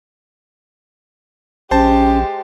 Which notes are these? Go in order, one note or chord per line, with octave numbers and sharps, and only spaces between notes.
A#1 G#3 C#4 G4 C5 A5